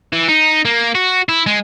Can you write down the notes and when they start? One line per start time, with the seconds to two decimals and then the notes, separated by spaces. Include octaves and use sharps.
0.13 E3
0.29 D#4
0.65 A#3
0.95 F#4
1.29 E4
1.47 G#3